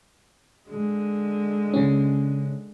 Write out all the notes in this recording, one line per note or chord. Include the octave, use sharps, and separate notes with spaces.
D3 G#3
C#3 C#4